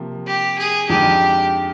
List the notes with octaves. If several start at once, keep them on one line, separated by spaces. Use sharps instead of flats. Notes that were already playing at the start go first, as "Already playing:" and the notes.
Already playing: C3 F3 A#3
G4
G#4
F2 D3 F3 G#3 D#4 G4